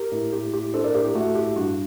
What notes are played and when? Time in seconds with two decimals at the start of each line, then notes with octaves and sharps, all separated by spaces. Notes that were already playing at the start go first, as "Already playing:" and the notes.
Already playing: G4 A#4
0.12 A2
0.32 A2 G4
0.53 A2 G4
0.73 D4 A4 C5
0.84 A#4 D5
0.94 A2 G4 A#4
1.05 G4
1.15 A3 F#4
1.35 A2 G4
1.56 G2 F#4